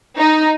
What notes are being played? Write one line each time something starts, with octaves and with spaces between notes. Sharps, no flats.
D#4